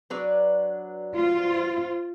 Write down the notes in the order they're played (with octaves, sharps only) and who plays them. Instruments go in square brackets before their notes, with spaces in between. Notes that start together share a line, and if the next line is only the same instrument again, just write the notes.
[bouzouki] F#3 D4 B4
[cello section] F4 C5